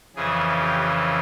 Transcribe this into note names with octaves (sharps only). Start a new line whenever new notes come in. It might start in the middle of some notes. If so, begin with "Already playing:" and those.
F2 C#3 E3 G#4
G4